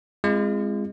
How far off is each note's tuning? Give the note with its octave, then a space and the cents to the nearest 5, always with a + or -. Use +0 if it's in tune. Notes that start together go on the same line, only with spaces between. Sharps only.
G#3 -15 C4 +0 F4 -40